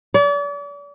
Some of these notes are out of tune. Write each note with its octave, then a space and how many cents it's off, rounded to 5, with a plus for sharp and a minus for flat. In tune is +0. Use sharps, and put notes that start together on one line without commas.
D5 -40